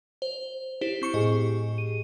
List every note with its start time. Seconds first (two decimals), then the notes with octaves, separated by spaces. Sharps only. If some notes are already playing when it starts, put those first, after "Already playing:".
0.22 C5
0.81 E4 G4 C5
1.02 C4 C#6 C#7
1.14 A2 G4 G#4 D#5
1.78 D#7